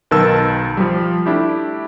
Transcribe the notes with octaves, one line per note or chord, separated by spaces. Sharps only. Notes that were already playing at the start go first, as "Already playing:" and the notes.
B1 D#3 A#4 B4 A5 E6
F3 G3
A3 D4 E4 G4